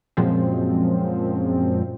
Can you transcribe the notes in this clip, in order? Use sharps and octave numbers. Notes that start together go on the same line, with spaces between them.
F#2 A#2 F3 G#3 C4